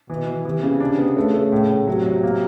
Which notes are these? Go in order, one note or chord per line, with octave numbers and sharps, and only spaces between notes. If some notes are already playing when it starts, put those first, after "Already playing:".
B2 E3
E3
C3 E3
C#3
D4
B3
C#3 A3
A3
A2
A2
C3 F#3
F#3
A#3